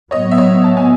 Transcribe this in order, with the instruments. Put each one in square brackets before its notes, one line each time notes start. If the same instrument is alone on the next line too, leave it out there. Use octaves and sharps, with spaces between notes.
[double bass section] A2 F#3 B3 [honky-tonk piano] C#5 D#5
[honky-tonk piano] E5
C#5 D#5
A5
G#5